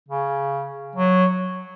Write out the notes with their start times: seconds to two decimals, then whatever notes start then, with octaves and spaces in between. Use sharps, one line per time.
0.09 C#3
0.95 F#3